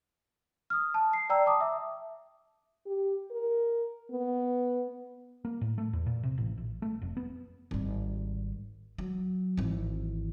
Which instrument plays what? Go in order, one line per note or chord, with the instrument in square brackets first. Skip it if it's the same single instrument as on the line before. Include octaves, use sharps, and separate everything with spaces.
[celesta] D#6 F6
A5
C7
D5 G5 A#5 E6
A5 D6 D#6
E5
[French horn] G4
A#4
B3
[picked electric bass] A#3
A2
A3
E2
A#2
C3
A1
A#1
A3
F1
B3
[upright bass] G#1 G3
F#3
G#1 E3